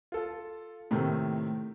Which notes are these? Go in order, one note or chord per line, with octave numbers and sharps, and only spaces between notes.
F4 A4
A2 C3 D#3 A3